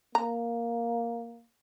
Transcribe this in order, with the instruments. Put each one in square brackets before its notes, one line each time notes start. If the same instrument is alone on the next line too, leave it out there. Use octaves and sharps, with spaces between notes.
[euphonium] A#3 [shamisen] A#5